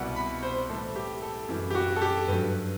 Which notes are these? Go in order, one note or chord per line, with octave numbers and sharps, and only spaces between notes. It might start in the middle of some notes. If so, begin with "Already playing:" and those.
Already playing: C2 B2 G3 F#5
B5
C5
A2 E3 G3 A4
G4
A4
F#2 E3 G3
G4
F#4
A4
G4
G2 F#3 B4